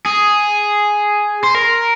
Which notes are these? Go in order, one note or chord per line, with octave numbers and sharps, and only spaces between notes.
G#4
C5
A#4